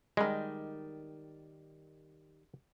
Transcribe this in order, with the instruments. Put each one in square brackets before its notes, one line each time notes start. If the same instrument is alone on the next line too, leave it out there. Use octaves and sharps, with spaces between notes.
[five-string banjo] D#3 G3 [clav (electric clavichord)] G#3